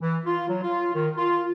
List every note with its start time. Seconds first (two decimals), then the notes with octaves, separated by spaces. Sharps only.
0.01 E3
0.26 F4
0.49 F#3
0.62 F4
0.94 D#3
1.17 F4